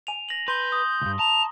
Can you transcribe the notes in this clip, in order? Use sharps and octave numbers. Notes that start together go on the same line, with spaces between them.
G#5 D#7 F7
A#6 F#7
B4 C6 G6 G7
D#6
C#2 G2
A5 A#5 F7